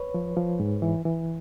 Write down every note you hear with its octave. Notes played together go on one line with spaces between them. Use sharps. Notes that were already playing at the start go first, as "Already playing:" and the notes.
Already playing: B4 C#5
F3
F3
G#2
E3
E3